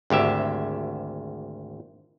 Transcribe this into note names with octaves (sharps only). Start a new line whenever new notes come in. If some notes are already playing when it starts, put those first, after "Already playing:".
G#1 D2 G4 E5